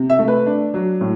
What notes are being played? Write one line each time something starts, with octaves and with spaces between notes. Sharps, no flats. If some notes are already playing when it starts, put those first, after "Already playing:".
Already playing: C3
E5
A3
B4
D4
F#3
A2